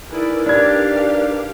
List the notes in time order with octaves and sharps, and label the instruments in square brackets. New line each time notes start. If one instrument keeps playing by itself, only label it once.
[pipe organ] D#4 A#4 B4 [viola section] E4 G#4 D5
[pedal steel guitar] D4 [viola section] G4 F5 [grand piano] D5 G#6